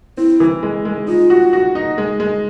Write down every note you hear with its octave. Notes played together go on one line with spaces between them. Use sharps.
C4 E4
E3
G#3
G#3
D#4 F4
F#4
F#4
D#4
G#3
G#3